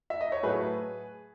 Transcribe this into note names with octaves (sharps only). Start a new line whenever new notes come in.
E5
D#5
C#5
A2 F#3 A3 G#4 B4